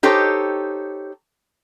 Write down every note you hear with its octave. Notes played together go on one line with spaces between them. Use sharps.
D#4 G4 A4 C5 C#5